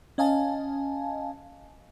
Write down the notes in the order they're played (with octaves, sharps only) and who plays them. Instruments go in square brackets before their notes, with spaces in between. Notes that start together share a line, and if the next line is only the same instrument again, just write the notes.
[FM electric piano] C#4 D#5 F5 G#5 A5